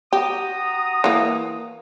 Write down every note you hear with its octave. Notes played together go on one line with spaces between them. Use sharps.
F#4 G4 A#5 D#6
E3 A#3